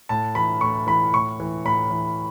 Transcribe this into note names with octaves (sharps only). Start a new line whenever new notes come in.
A2 A5
E3 B5
A2 C#6
E3 B5
A2 C#6
E3
A2 B5
E3